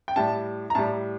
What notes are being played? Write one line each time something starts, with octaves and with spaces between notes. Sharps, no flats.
G5
A2 G3 A5
A#5
A2 G3 A5